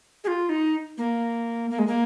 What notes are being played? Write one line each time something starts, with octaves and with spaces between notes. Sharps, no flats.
G#4
F4
D#4
A#3
A#3
G#3
A#3